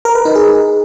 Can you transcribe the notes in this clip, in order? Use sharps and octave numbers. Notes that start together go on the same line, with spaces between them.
A#4
B4
D#4
G#4